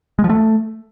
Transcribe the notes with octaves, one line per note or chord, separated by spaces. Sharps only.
G#3
F3
A3